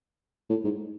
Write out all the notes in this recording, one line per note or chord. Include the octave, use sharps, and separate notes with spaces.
A2
G#2